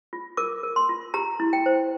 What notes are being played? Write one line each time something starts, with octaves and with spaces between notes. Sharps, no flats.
F4
A#4 D6
A#4
C6
F4
G4 A#5
E4
G5
C5